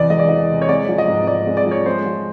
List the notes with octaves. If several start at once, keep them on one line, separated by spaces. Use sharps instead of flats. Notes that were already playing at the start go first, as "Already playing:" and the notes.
Already playing: E2 C3 E3 D5 D#5
G#3 D#5
D5
E3 D#5
C3
C#5
G#3 D5
F3
D#5
G#2
G#2 D5
G#3
D5
F3 C#5
G#3 C5
F3